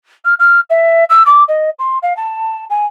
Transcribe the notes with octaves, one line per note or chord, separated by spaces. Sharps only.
F6
F6
E5
E6
D6
D#5
C6
F5
A5
G#5